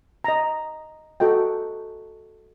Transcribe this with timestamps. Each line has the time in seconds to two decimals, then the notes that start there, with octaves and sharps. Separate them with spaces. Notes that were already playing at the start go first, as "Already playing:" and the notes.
0.24 D#5 A#5
1.20 F#4 A4 D#5 G5